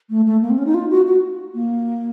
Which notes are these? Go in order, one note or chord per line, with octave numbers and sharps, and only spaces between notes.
A3
A3
A#3
C4
C#4
D#4
F4
F#4
F#4
A#3